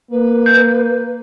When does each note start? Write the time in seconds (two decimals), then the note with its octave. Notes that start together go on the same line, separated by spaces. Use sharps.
0.11 A#3 B4
0.46 G6